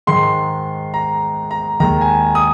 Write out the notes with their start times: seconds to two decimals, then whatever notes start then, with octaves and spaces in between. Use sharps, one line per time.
0.07 G#2 D#3 G#3 C6
0.94 A#5
1.51 A#5
1.80 D#2 D#3 G#3 A#5
2.01 G#5
2.35 D#6